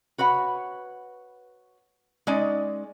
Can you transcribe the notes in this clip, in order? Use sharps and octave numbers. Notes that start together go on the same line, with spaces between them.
F#4 B4 C#5 F#5
G#3 C#4 D#4 D5 G#5